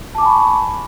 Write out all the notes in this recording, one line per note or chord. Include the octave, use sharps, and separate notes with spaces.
G#5 A5 B5 C#6 D6